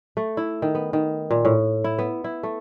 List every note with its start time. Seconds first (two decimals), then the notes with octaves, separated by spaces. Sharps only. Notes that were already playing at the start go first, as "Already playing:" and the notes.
0.17 A3
0.37 E4
0.62 D#3
0.75 B3
0.93 D#3
1.31 A#2
1.45 A2
1.84 E4
1.99 B3
2.24 E4
2.43 A3